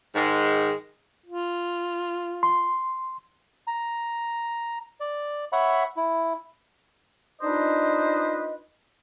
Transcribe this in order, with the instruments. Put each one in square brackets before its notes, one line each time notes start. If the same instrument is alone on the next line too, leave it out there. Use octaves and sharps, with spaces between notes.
[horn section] G#2 D#3 G#3
[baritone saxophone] F4
[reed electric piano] C6
[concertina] A#5
D5
C#5 E5 F#5 B5
E4
[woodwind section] D4 D#4 F4 B4 C5 D#5